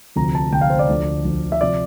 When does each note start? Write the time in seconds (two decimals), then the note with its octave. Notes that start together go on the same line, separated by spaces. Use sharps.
0.16 D2 C3 F3 A#5
0.35 A5
0.52 D2 C3 F3 G5
0.61 F5
0.70 C5
0.79 D5
0.89 D2 D3 F3
1.25 D2 D3 F3
1.52 E5
1.61 C3 F3 D5